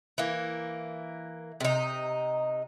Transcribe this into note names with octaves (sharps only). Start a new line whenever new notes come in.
E3 A#3
C3 D#4